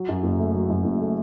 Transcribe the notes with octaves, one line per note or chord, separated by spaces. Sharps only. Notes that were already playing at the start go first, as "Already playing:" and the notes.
Already playing: F#3
F#2
F#1
A3
F#3
F#2
F#1
A3